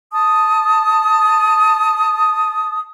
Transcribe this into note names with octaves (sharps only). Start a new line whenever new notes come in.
A5 D#6